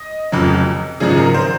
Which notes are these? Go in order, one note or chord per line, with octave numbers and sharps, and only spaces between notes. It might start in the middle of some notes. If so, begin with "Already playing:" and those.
Already playing: D#5
F1 F2 C#3 F#3
G#1 F#2 C#3 F3 G#4
A#4
C5